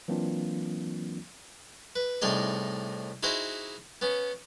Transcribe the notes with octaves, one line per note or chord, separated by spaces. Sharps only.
E3 F#3 A#3 C4 D4 F4
B4
C2 A2 D#4 G#4 D#5
D#4 E4 F#4 G#4 C5
B3 C#4